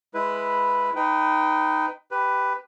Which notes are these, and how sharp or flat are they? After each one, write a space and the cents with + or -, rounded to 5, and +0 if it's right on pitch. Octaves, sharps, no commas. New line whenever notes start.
G#3 +0 E4 +0 B4 +0
D#4 +0 B4 +20 G5 -15
G4 -5 B4 +10